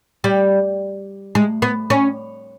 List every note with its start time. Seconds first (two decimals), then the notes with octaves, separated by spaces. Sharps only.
0.24 G3
1.35 G#3
1.62 B3
1.90 C#4